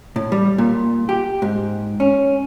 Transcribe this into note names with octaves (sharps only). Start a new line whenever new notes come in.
A2
G3
A#2
G4
G#2
C#4